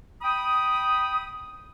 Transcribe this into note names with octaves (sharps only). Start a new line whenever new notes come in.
G5 B5 D#6